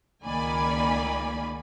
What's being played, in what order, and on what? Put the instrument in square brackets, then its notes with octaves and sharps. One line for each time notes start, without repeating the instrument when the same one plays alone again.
[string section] C#2 D#3 A#3 D5 G#5 B5